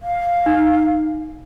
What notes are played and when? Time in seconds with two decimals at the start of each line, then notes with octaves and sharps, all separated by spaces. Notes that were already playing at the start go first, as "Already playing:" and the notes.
0.02 F5
0.46 D#4